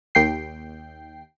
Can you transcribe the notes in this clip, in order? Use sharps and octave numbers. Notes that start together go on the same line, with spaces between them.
D#2 G5 C7